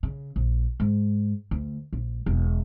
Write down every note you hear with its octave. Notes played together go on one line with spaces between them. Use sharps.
C#3
A#1
G#2
D2
A#1
E1